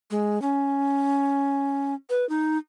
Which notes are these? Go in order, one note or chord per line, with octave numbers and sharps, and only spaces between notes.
G#3
C#4
B4
D#4